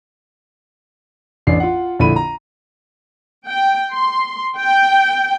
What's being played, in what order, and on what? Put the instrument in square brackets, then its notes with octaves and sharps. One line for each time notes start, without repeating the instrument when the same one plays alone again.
[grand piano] A1 D4 C7
F4 F#5
A#1 D3 E4 B5 D#7
A#5
[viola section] G5
C6
G5